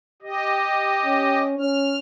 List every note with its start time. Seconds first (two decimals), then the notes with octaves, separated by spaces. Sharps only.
0.22 G4 D#5
1.05 C#4
1.59 C#4 F6